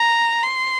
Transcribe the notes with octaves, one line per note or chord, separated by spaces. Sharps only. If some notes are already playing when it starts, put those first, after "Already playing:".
Already playing: A#5
C6